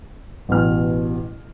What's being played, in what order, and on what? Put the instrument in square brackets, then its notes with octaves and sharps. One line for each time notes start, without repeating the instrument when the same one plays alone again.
[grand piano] A1 B2 F6